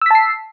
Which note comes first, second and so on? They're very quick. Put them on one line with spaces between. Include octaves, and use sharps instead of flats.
E6 B6 A5 C7